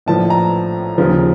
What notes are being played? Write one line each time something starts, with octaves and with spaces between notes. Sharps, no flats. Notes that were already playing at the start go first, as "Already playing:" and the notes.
A#1 A2 F3 A5
A#5
D#2 C#3 F3